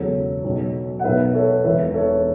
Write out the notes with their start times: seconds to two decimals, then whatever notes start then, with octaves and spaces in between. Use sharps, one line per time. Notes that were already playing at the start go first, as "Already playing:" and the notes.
Already playing: E1 E2 C#3 F#3 A4 C#5
0.44 B1 B2 F#3
0.99 F#5
1.04 B1 B2 F#3 B4 E5
1.34 A4 C#5
1.64 E1 E2 E3 B4 E5
1.94 A4 C#5